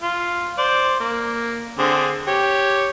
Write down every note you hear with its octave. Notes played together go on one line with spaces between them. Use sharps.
F4
C5 D5
A#3
D3 C4 G#4
G4 C#5